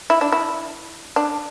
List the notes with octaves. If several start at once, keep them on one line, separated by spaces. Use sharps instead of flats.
E4
D4
E4
D4